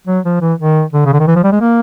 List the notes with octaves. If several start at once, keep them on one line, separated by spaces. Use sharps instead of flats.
F#3
F3
E3
D#3
D3
C#3
D3
D#3
E3
F3
G3
G#3
A#3